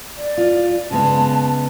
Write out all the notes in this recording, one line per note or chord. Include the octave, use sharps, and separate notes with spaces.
D5
F4
C#3 G#3 B3 A5